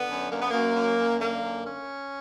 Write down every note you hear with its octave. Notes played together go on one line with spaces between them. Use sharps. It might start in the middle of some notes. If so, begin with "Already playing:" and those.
Already playing: D3 B3
F#2
F#2 A#3
B3
F#2 A#3
F#2
F#2
D3 A#3
F#2
C#4